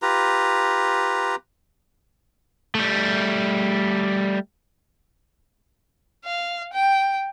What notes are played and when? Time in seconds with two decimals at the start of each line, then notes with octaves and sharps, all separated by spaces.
0.02 F4 G4 B4 A#5
2.75 G3 A3
6.25 F5
6.73 G5